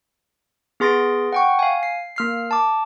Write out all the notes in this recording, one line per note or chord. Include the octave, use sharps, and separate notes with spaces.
B3 G#4 C6 A6 A#6 D7
F#5 G5 C#6
F5 G#5
C7
A#3 F6 C7
A5 D6